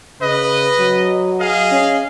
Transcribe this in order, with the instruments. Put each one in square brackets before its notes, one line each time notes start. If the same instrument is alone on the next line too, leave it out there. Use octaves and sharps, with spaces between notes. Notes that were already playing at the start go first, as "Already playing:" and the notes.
[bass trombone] C#3 [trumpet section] B4 D#5
[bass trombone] F#3
[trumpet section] G#4 D#5 F5
[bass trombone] C#4